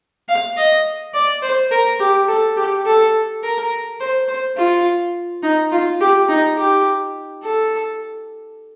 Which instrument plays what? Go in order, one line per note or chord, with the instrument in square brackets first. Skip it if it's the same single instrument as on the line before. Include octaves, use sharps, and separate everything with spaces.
[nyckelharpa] F5
D#5
D5
C5
A#4
G4
A4
G4
A4
A#4
C5
C5
F4
D#4
F4
G4
D#4
G4
A4